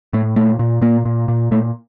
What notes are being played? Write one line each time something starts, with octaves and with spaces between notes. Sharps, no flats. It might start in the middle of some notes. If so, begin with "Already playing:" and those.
A2 A3
A#2 A3
A#2
A#2 A#3
A#2
A#2
A#2 A3